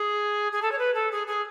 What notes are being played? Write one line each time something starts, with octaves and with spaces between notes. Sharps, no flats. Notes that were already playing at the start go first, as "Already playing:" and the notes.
Already playing: G#4
G#4
A4
C#5
B4
A4
G#4
G#4